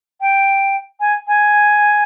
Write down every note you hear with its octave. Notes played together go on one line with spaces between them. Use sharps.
G5
G#5
G#5